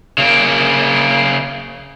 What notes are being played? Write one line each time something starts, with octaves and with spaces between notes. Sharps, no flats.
C#3 A#3